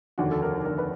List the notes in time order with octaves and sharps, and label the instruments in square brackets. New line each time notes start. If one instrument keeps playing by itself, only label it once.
[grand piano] F1 D#2 D3 F#4
A4
A#4
F1 D#2 D3 A#4
B4